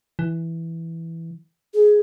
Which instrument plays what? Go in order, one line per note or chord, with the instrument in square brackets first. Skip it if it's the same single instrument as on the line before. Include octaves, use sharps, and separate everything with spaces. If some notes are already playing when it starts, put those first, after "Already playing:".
[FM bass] E3
[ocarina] G#4